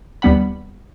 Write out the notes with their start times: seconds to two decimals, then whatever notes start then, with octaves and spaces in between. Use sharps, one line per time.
0.22 D#2 G3 B3 F#5 B5